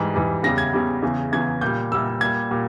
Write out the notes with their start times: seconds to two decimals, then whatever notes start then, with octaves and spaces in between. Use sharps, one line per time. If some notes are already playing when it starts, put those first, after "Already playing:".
Already playing: G#2 E3 G3
0.14 G#2 E3 G3
0.43 E2 C#3 G3 A#6
0.58 G#6
0.73 E2 C#3 G3
1.02 E2 C#3 E3
1.32 E2 C#3 E3 G#6
1.61 A#2 G3 G6
1.92 A#2 G3 E6
2.20 A#2 G3 G#6
2.51 A#2 G3